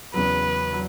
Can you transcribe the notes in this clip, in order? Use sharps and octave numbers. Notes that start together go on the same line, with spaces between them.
E2 C#3 F#3 B4
F#3